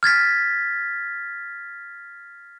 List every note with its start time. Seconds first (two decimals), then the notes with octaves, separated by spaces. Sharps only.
0.03 F6 G#6 A6 B6